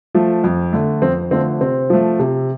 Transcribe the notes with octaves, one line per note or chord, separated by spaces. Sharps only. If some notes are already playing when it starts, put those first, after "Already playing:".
F3 A3
F2
D3 A3
F2 C4
D3 F3 A3 C4
C3 C4
F3 A3
C3